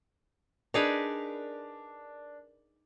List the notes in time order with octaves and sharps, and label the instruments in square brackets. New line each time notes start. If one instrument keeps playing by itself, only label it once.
[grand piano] D4 [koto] D#4 G#4 B4 [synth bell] A#4 D5